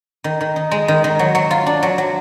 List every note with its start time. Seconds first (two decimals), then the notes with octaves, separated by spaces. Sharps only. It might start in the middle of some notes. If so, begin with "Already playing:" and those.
0.24 D#3
0.41 D#3
0.56 D#4
0.71 G#3
0.88 D#3
1.04 D#3
1.19 F#3
1.35 F#3
1.51 F4
1.66 D4
1.83 F#3
1.98 F#3